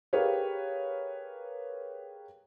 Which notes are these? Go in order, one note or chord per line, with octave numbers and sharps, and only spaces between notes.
G4 G#4 A#4 B4 C#5 F5